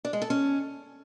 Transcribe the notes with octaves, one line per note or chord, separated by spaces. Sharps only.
D4
G#3
A4
C#4